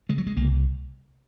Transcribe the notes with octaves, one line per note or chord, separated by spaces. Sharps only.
C#3 G#3
F#3
G#3
C2 A#3